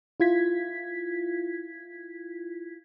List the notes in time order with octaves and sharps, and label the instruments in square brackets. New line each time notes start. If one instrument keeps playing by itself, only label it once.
[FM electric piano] E4 F4 G#6 B6